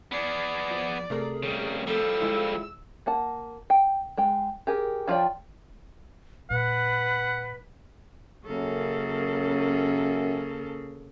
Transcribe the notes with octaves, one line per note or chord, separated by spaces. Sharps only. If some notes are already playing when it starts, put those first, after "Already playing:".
B3 G#4 D5
F3
C3 A3 G#4 A#4
C#3 G3
F3 G3 A4 E6
G#3 E4 F4
A#3 F#5 A5
G5
G#3 G5
G4 G#4 A#4
F3 F4 C#5 D5 G5
A#2 B4 F#5
F#2 C#3 A#3 A4